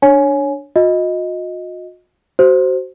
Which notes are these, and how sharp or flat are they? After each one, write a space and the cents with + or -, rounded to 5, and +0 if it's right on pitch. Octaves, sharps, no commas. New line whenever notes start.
D4 +0 C#5 +0 G#5 +15
F#4 -45 D#5 +10
F#4 +25 C5 +0